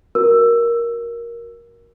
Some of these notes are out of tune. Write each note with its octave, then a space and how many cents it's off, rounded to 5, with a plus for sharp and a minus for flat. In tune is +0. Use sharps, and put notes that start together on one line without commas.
F#4 +0 A#4 +10 E6 +10